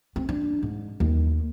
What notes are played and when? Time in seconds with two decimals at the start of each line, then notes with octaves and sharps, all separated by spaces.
0.16 C4
0.29 D4
0.63 G#2
1.00 D#2